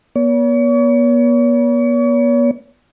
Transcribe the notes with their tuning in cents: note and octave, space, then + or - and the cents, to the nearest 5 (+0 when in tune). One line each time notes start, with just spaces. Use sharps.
B3 -40 C#5 +40